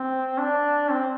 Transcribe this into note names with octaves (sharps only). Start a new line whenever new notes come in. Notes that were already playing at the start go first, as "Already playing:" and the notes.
Already playing: C4
D4
C4